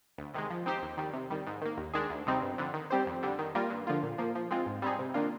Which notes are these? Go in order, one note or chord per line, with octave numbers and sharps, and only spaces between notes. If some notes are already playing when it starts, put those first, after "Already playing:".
D2
C3 D#3 G#3
F3
C4 D#4 G4 C5
D#2
D#3 G3
C3
D#3 G3
G#2
D#3 A#3
D#2
D#3 G#3 D4 G#4
D2
C3 G3 C4 D#4
G1
F2 D3
D#3
G3 C4 G4 C5
F2
D3 G3
D#3
G3 A#3 F4 A#4
G2
D3 F3 A#3 F4
A#2
F3 A#3
F3
G#3 C4 F4
G#2
G3 C4 D#4 G#4
C3
D#3 A#3 D4 F4